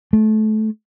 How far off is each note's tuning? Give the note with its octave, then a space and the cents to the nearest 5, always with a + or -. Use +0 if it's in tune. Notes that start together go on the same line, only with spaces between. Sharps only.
A3 -25